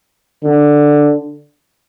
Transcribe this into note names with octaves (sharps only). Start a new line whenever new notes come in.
D3